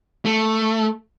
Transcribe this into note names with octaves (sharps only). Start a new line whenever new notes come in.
A3